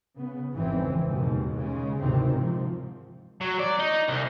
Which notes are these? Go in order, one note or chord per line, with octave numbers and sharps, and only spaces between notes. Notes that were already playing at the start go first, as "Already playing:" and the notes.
C#3 B3
G#1 F2 C#3 E3 C4
D#2 G#2 B2
C#3 G#3
G#1 D2 C3 D#3 E3 C4
G#2 C3 F3
F#3
D5
D#4
C2